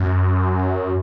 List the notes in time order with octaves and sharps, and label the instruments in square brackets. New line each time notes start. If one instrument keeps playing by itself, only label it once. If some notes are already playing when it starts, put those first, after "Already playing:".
Already playing: [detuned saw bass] F#2